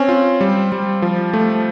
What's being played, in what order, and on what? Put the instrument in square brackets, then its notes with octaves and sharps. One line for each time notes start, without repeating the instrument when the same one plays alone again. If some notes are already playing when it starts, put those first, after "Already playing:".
Already playing: [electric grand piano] C4 [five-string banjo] C#4
[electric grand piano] F4
G3
G3
F3
A3